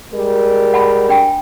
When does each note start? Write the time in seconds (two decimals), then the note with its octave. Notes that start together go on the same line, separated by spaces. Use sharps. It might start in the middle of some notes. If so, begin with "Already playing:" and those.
0.13 G3 G#3 A#4
0.74 F#5 A5 B5
1.09 D4 G5